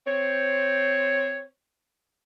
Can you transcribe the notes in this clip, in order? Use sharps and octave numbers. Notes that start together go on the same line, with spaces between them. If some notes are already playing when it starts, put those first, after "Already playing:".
C4 C5 C#5